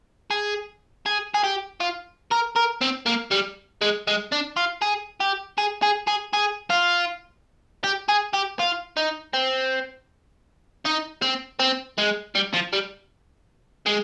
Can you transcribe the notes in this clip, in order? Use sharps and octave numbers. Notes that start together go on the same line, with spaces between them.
G#4
G#4
G#4
G4
F4
A#4
A#4
C4
A#3
G3
G#3
G#3
D4
F4
G#4
G4
G#4
G#4
G#4
G#4
F4
G4
G#4
G4
F4
D#4
C4
D#4
C4
C4
G#3
G3
F3
G3
G#3